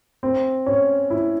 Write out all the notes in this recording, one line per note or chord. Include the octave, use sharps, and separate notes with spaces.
C4
C#4
E4